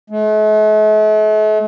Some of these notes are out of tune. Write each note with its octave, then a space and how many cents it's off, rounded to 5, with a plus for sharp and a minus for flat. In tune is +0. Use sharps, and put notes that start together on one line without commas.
A3 -45